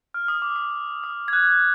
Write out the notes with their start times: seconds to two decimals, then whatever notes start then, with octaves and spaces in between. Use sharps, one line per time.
0.14 F6
0.28 D#6
0.42 D6
0.56 D#6
1.04 D#6
1.28 G#6
1.33 F#6